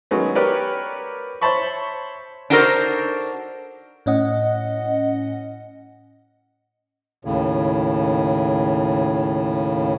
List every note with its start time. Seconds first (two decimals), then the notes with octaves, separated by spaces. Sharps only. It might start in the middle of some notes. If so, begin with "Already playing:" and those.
0.11 D#3 F#3 G#3 A3 B3 C#4
0.35 B3 G4 A#4 B4 C#5 D5
1.41 C5 C#5 E5 A5 B5 C#6
2.50 D4 D#4 F#4 A4 A#4 C5
4.06 A2 C#4 D#5 F#5
7.25 D#2 A2 C#3